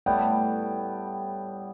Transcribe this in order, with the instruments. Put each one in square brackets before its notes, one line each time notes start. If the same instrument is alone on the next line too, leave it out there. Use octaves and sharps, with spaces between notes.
[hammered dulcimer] A2 G3 B3 [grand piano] G5